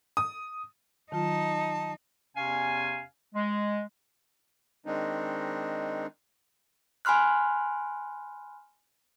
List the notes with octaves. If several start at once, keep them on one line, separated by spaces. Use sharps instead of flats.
D#6
D#3 F#3 D#4 F4 A5
E2 C3 C#4 F5 G#5
G#3
D#3 G#3 C4 D4 D#4
G#5 B5 C6 F6 F#6